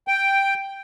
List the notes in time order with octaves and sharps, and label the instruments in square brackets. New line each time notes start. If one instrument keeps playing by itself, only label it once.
[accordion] G5